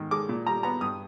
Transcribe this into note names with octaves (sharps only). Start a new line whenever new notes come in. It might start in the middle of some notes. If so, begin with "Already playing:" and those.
Already playing: G#2 D#3
G#3 D6
A#2
G3 A#5
B3 A#5
G2 D#6